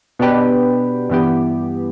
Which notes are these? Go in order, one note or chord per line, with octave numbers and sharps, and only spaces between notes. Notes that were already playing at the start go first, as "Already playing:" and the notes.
B2 B3 D4 G4 B4
G2 E3 B3 G4